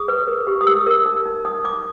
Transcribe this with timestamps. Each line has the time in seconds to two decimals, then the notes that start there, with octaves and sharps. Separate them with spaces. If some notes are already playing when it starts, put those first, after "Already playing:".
Already playing: G#4 D#6
0.08 B4
0.27 A#4
0.47 G4
0.61 D#6
0.67 G4 E6
0.87 A#4
1.06 D#4
1.25 D#4
1.45 D#4 D#6
1.64 D#4 D6